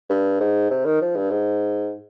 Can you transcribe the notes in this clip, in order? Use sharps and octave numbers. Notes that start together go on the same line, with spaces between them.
G2
G#2
C3
D#3
F3
G2
G#2